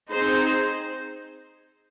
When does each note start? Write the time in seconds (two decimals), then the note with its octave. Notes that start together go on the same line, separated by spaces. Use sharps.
0.11 C4 D#4 G#4 C5